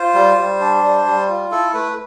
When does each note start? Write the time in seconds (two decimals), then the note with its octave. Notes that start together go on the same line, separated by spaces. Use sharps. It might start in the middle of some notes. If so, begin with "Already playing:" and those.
Already playing: F4 C5
0.14 G3
0.37 G3
0.61 D4
0.83 G3
1.06 G3
1.29 F4
1.51 E4 A4
1.74 A3 B4